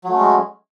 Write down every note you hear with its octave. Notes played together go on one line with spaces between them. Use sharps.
F#3 G#3 A3 C#4